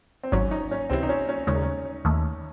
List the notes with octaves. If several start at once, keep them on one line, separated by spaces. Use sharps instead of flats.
C4
G#1 G#2 F#3 C#4
D#4
C#4
C#2 C3 E3 C4
D#4
C#4
C#4
D#2 C#3 G#3 C#4
D#4
C#4
D#2 D#3 A3